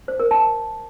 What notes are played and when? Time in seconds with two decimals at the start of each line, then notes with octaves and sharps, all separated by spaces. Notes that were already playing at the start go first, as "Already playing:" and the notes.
0.08 C5
0.20 A#4
0.31 A5